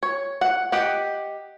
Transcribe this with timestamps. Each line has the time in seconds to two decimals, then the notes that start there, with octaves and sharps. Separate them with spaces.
0.03 C#5
0.41 F#5
0.72 G4 D#5 F#5